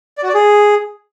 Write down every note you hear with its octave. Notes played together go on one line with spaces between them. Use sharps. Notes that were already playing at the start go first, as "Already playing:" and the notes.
D5
F#4
D5
G#4